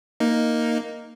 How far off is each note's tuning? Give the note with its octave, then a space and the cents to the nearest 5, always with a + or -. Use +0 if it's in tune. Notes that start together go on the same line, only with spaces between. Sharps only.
A#3 +0 D#4 +0